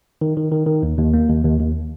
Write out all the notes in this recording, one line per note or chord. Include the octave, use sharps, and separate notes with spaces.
D#3
D#3
D#3
D#3
D#2
D#2
A#3
D#2
D#2
D#2